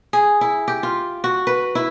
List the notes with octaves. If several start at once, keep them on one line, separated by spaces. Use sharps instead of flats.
G#4
E4
G4
F4
F#4
B4
E4